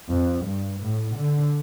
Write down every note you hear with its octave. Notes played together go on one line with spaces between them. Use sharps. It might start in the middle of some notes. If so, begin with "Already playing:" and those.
F2
G2
A2
D3